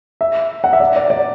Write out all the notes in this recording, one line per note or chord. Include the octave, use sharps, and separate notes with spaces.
E5
F#5
E5
D5
D5
D5